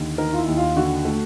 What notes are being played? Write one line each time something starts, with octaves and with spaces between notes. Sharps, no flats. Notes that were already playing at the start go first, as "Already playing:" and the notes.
Already playing: D#2 D3
D#3 A#4
F4
E4
D#2
F4
D3 F#4
A3